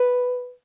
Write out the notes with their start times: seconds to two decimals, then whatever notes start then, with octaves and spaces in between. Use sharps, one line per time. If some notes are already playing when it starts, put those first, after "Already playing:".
Already playing: B4